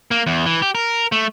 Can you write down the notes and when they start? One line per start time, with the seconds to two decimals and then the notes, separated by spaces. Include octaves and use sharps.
0.11 A#3
0.27 E2
0.46 E3
0.62 G4
0.75 A#4
1.12 A3